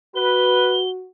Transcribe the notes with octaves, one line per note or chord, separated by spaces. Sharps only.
F#4 B4 G7